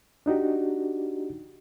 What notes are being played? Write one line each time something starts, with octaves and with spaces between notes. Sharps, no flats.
D4 D#4 F#4 G4